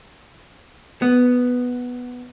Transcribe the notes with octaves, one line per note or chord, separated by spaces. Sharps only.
B3